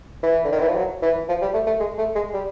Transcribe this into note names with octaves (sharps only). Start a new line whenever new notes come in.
E3
D3
D#3
E3
F3
F#3
E3
F3
G3
A3
A3
G#3
A3
G#3
G3